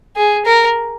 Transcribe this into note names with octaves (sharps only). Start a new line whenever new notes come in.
G#4
A#4